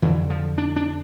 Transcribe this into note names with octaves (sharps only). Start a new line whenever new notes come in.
F2 D3 E3
F3
D4
D4